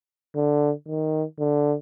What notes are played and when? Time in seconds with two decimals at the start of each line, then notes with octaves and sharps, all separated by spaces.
0.36 D3
0.88 D#3
1.39 D3